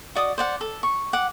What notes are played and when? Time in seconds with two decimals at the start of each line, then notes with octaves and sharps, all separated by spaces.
0.15 F#4 D5 D#5 D#6
0.38 C5 D5 F#5
0.61 A4
0.83 C#6
1.13 F#5 D6